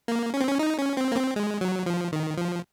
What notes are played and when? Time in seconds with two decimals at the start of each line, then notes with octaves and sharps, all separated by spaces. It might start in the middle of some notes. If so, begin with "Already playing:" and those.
0.08 A#3
0.34 C#4
0.41 C4
0.48 C#4
0.59 D#4
0.79 C#4
0.97 C4
1.12 A#3
1.17 C4
1.36 G#3
1.61 F#3
1.86 F3
2.12 D#3
2.38 F3